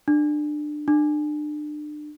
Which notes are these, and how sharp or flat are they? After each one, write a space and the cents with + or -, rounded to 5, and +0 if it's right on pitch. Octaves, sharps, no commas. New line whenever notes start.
D4 +25
D4 +35